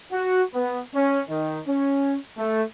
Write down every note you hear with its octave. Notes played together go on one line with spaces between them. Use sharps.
F#4
B3
C#4
D#3
C#4
A3